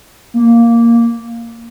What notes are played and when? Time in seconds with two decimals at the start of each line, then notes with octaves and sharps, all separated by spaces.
0.34 A#3